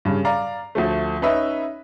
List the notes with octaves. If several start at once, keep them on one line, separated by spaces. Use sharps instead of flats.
G2 C#3
D5 F5 A#5
D2 F3 A3
C#4 D#4 B4 E5